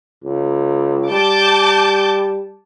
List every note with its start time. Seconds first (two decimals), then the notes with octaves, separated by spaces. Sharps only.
0.24 C#2
1.11 G3 A5 D6 G6